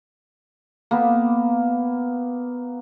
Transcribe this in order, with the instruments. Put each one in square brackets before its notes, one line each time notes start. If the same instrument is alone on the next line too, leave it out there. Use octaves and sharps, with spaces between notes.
[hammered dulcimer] A#3 B3